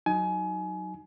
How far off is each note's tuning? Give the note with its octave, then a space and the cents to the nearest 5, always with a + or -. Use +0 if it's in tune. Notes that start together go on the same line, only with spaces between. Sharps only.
F#3 +0 D#4 +5 G#5 +25